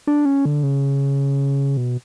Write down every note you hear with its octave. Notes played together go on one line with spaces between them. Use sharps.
D4
C#4
D3
C#3
B2